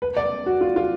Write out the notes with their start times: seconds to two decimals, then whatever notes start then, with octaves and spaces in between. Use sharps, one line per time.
0.02 B4
0.17 D5
0.46 F#4
0.61 F4
0.76 F4